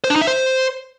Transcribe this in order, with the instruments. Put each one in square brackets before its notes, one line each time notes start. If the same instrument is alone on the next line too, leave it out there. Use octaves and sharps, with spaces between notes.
[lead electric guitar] C5
D4
D#4
E5
C5